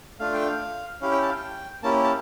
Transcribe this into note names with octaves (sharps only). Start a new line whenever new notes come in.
A3 D4 F4 F5
G5
F5
C#4 E4 G4 F5
G5
A5
F5
G5
A#3 C#4 E4 G4 A5
A5